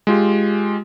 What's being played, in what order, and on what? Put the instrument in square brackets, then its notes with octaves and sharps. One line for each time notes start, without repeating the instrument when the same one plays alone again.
[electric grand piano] G#3 F4 G4